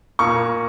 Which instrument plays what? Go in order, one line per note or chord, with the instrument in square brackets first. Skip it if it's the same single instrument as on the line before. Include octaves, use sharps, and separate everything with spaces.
[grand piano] A#2 A#3 C#6